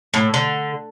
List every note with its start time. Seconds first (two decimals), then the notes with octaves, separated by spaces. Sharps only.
0.14 A2
0.34 D3